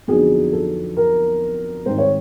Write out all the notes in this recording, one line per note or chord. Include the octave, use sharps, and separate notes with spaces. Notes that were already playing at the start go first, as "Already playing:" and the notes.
F2 D3 F#3 B3 D#4 G#4
A4
A#4
G#2 D#3 G3 C4 C5
C#5